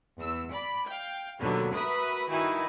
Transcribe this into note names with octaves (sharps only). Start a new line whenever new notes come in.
E2 E6
D5 B5
F5 G5
D#2 B2 D3 F#3 A#3 B3
F#4 A#4 B4 E5 B5 D#6
G2 D#3 D#4 E4 F#4 G#5